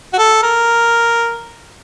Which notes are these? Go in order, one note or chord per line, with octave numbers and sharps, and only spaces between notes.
F#4
A4
A#4